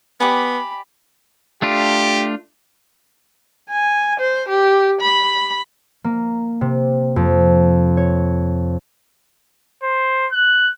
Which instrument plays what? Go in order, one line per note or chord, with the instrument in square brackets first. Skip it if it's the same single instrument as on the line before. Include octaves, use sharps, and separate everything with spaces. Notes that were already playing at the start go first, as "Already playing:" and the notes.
[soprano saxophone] B3 [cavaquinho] G4 D5 G#5 [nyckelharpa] B5
[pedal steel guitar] A3 D4 F4 [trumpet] G4
[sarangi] G#5
C5
G4
B5
[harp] A#3
C3
F2
C#5
[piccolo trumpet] C5
F#6